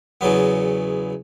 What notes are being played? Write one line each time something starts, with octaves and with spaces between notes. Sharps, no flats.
E2 C#3 F#3 B3